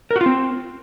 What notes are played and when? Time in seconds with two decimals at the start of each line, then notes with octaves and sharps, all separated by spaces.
0.11 A#4
0.16 F#4
0.21 F4
0.26 C4